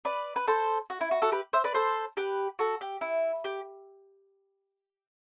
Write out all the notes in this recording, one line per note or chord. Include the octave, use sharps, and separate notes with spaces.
B4 D5
B4
A4 C5
F#4
E4
F#4
F#4 A4
G4 B4
C5 E5
B4 D5
A4 C5
G4 B4
F#4 A4
G4
E4
G4